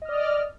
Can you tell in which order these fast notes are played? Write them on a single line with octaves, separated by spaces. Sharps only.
D#5 F6 D5